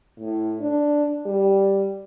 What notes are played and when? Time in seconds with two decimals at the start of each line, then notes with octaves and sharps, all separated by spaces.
0.19 A2
0.61 D4
1.26 G3